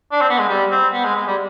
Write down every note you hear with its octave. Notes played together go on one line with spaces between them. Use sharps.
D4
C4
B3
G#3
G3
C4
B3
G#3
G#3
G3